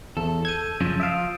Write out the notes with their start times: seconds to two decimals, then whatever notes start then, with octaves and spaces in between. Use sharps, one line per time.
0.17 E2 A4
0.45 E6 G6 G#6 D#7
0.81 F#2 C#3 F3 C#4
1.00 E5 F5 D#6 D7 E7